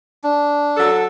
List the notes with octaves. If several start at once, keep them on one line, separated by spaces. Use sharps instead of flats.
D4
F#3 A4